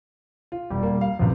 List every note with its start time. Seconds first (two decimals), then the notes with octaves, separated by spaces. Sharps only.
0.52 F4
0.70 E1 G3
0.83 A#3
1.01 F5
1.19 D#1 A1 C3 F3